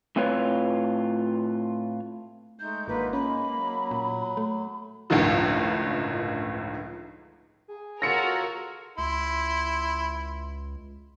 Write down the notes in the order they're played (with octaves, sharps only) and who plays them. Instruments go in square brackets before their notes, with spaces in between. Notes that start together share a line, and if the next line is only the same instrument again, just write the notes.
[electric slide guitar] A2 C4 F4 B4 C#5
[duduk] G#3 [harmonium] A3 D#4 [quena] G6
[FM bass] G#1 [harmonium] D3 D#4 F4 [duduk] A#3 [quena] B4
[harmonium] G#3 [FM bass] C#4 [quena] B5
[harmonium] F#3
[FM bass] A#2
A3
[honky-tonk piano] G1 C#2 A2 D3 D#3 F3
[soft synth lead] G#4
[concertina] F4 A4 C#5 [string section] F#4 A#4 [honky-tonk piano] A#6 C#7
[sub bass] C#2 [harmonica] E4 C6